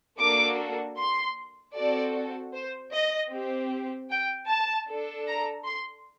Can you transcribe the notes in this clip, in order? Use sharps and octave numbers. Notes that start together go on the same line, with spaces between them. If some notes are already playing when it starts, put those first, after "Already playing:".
A#3 D4 F#4 A4 D6
C6
C4 F#4 A4 D5
C5
D#5
C4 G4
G5
A5
D4 A4
A#5
C6